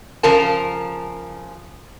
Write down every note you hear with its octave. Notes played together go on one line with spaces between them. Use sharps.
C#3 F3 A#4 A5